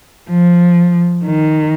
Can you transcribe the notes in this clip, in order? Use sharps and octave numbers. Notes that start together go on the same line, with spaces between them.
F3
D#3